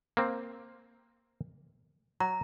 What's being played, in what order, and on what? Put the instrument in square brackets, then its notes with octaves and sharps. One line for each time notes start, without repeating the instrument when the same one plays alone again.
[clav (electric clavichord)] A#3 C4
[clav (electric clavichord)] F#3 [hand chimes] A#5